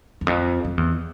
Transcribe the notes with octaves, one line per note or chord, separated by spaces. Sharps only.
E2
F2
F2
E2